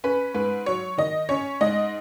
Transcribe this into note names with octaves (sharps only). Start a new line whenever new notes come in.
C#4 B4
G#2 B4
F#3 C#5
D#3 D#5
C#4 C#5
G#2 D#5